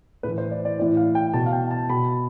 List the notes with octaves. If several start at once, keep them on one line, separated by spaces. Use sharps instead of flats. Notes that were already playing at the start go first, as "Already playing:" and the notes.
A2 E3 B4
C5
D5
D5
A2 E3 D5
F5
G5
B2 A5
F5
G5
A5
B2 B5